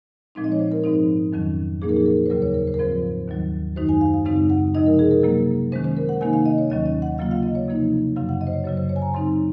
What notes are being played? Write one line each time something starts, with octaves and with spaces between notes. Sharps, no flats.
A#2 F3 G#3 C4 D#4
D#5
C#5
C5
A#4
G#2 F3 C4 D#4
F2 D#3 F#3 C#4
A#2 F3 A#3 D#4 G#4
A#4
G#4
A#4
C5
D#2 C#3 F#3 A#4
C#5
A#4
C5
A#4
G#2 F3 C4 F4 C5
D#2 D#3 F#3
F#2 D#3 G#3 D#4 C5
G#5
F5
F5
F#2 C#3 G#3 C4 D#4 F5
F#5
C3 F3 G#3 D#4 D#5
A#4
G#4
A#4
C3 F#3 A#3
D#3 G#3 C#4 C5
C5
A#4
F#5
C3 D#3 A#3 D#4 G#5
F5
D#5
C#5
D#2 D#3 F#3 C#4 D#5
D#5
F#5
C#3 F#3 A#3 F4 F5
F5
D#5
C#5
C3 F3 A#3 D#4
F#2 C#3 F#3 F5
F#5
D#5
C5
C#5
F#2 C#3 F#3 C#5
C5
C#5
G#5
A#5
C#3 F#3 C4 D#4 C6